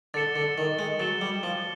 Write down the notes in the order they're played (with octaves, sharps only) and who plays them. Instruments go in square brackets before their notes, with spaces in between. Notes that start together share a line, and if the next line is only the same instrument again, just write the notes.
[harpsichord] D3 [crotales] A6 C#7 E7 G7
[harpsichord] D3
D#3
G#3
[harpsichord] F#3 [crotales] A6 C#7 E7 G7
[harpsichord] G3
F3